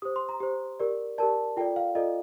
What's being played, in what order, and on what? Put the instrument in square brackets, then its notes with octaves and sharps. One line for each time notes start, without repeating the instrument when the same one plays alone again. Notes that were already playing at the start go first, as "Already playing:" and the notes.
[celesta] G4 C5 D#6
C6
A#5
G4 C5
G4 A#4 D5
G4 A#4 D5 A5
F4 A4 D5 G5
F5
F4 A4 D5 D#5